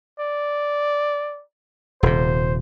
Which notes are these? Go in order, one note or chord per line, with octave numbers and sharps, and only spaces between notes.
D5
D#1 C3 C5